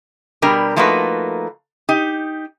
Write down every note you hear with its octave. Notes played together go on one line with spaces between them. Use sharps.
B2 G3 D4 G4 A#4
F3 A3 A#3 D#4 F#4 B4
D#4 G4